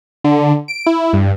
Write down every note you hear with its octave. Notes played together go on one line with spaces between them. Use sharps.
D3
D7
E4
G2